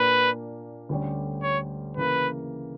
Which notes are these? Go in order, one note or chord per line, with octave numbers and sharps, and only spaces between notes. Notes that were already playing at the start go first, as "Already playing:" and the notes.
Already playing: A#2 A#3 D4 B4
D2 D3 G3 C#4 G4
C#5
C#3 E3 A#3 B4